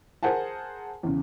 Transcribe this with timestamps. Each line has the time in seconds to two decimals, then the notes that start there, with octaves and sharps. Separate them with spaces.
0.23 G#4 A#4 C5 F#5 G#5 A5
1.03 E2 C#3